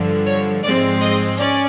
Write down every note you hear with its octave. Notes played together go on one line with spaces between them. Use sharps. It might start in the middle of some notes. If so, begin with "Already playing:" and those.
Already playing: G2 D3 F3
C#5
G#2 F3 G#3 C4 D5
D#5
C#4 D5